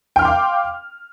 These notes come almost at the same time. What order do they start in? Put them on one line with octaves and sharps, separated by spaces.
G5 F6 C6 D6 F5